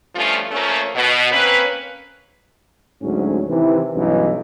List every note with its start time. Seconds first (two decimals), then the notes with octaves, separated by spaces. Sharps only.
0.15 G2 F3 A3 C#4 F4
0.51 F3 A3 A#3 C#4
0.96 B2
1.32 A#3 C4 C#4 B4
3.02 D2 G#2 F#3 C#4
3.46 C3 D#3 E3
3.94 B1 G2 E3 C#4 D#4